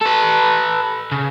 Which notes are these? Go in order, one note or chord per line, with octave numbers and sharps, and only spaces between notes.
A4 B4
C#3